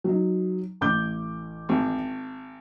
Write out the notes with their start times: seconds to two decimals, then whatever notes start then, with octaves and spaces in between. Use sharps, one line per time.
0.04 F#3 D#4
0.81 A1 D6 G6
1.69 G#1